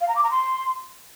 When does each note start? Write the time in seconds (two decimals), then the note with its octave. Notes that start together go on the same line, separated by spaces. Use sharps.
0.01 F5
0.08 A#5
0.16 D6
0.23 A#5
0.31 C6